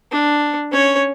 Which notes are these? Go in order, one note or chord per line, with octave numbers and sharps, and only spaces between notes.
D4
C#4 C#5